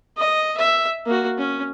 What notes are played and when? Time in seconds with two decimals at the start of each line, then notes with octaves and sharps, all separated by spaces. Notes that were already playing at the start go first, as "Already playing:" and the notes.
0.17 D#5
0.57 E5
1.06 A#3 F#4
1.38 C#4